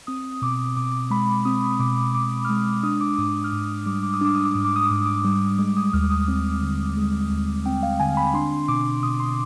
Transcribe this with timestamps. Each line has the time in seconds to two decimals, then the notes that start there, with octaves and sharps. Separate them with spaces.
0.07 C4 D#6
0.42 B2 D6
0.76 B2 D6
1.10 G#3 B5
1.45 C4 D#6
1.79 B2 D6
2.14 B2 D6
2.45 F6
2.49 G#3 D#6
2.83 D4 D#6
3.01 D6
3.18 G#2 D#6
3.44 F6
3.52 G#2 D#6
3.86 G3 D6
4.03 D6
4.13 D#6
4.21 D4 D6
4.35 D#6
4.45 D6
4.54 G#2 D#6
4.65 D6
4.76 D#6
4.86 G#2 D6
4.96 D#6
5.05 D6
5.24 G3
5.59 G#3 D6
5.77 D#6
5.93 D#2 F6
6.10 D#6
6.28 C4
6.62 D3
6.97 G#3
7.30 D#2
7.66 C4 G5
7.83 F5
8.00 D3 G#5
8.17 B5
8.34 D4 C6
8.68 B2 D6
9.03 B2 D#6
9.20 C6